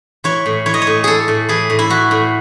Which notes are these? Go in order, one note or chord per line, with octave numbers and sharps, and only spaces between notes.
E3 C#5
A2
E3 C#5
D#5
C#5
A2
E3 G#4 A4
A2
E3 G#4
A2
E4
E3 F#4
A2